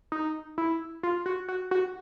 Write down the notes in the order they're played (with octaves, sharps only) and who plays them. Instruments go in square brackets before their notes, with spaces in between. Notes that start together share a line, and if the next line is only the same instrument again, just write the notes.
[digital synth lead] D#4
E4
F4
F#4
F#4
F#4